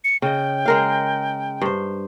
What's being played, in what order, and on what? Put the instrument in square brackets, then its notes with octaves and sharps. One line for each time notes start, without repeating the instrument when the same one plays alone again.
[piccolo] C#7
[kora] C#3 D#5 [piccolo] G5
[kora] G#3 A#4 F5
G2 C5